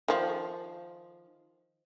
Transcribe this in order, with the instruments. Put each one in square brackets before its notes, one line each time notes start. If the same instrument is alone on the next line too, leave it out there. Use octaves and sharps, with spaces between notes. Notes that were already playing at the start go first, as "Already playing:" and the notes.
[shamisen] D#3 F3